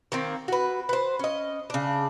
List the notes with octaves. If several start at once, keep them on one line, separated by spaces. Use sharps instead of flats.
D#3 A#3 C4
F#4 B4
B4 C5
C#4 D#5
C#3 D4